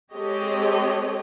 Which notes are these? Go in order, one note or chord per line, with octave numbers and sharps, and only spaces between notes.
G#3 C4 G4 A4 C#5 D#5